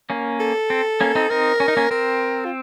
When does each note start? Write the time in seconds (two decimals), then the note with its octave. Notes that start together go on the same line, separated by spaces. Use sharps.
0.10 A#3 C#4
0.40 A4
0.70 C4
1.01 A#3 C#4
1.15 C4 D#4
1.30 C4 D#4 A#4
1.60 C#4
1.68 D#4
1.77 A#3 C#4
1.91 C4 A#4
2.45 F4